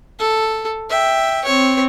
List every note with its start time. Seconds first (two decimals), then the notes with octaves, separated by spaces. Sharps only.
0.19 A4
0.90 E5 G5
1.44 C4 C#5